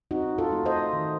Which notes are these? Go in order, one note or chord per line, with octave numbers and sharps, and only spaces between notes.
C4 D#4 F#4
F4 A4
A3
C5 D#5
D#3